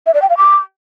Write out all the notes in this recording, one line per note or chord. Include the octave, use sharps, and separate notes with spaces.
E5
D5
G5
F5
D6